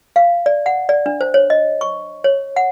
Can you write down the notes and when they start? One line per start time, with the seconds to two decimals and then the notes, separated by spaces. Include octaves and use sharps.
0.16 F5
0.46 D5
0.66 F#5
0.89 D5
1.06 D4
1.21 C5
1.34 C#5
1.50 D#5
1.81 C#6
2.24 C#5
2.56 F#5